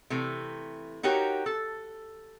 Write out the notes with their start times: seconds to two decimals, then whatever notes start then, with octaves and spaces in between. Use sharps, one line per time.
0.10 C3 E3 A3
1.03 D#4 F#4 G4 A#4 C#5
1.46 A4